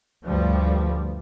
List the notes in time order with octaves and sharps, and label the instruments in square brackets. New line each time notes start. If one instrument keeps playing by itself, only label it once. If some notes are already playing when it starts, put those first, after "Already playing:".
[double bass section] D2 G2 F3 G3